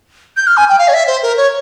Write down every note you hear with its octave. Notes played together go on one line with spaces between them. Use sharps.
G6
F6
G#5
G5
F5
C#5
E5
C5
A#4
C#5